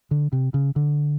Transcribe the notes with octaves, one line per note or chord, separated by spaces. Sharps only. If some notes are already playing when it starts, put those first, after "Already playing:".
D3
C3
C#3
D3